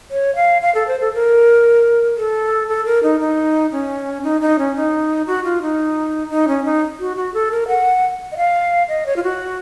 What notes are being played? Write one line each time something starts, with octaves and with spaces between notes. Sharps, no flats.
C#5
F5
F5
A4
C5
A4
A#4
A4
A4
A#4
D#4
D#4
C#4
D#4
D#4
C#4
D#4
F#4
F4
D#4
D#4
C#4
D#4
F#4
F#4
A4
A#4
F#5
D#5
F5
D#5
C#5
F4
F#4